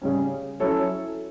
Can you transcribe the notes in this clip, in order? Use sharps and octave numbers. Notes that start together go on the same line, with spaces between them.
C#3 G3 C#4
F#3 C#4 E4 A4 C#5